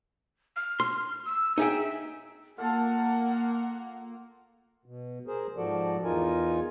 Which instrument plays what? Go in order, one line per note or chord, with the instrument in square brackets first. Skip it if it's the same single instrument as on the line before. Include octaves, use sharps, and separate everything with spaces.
[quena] F6
[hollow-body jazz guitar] C6 [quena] F6
[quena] E6
[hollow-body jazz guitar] D#4 G#4 G5 [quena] E5
[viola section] A#3 [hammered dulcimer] F4 A4 [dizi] F#5
[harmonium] B2
G#4 A#4 C5
G#2 F3 F#4 A4 D5
E2 D#4 F4 A#4 G#5